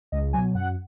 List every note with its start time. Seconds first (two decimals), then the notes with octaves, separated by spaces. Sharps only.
0.12 C#2 D#5
0.33 B2 F#3 G#5
0.54 F#2 F#5